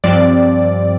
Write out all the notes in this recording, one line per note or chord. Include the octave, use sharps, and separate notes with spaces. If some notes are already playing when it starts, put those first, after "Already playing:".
G2 F3 C4 D5